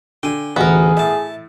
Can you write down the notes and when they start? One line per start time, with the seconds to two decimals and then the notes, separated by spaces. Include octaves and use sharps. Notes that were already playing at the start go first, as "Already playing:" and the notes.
0.23 D3 G5 G#5
0.56 A1 D2 B3 F#4 G#4 A#4
0.97 A2 E5 A5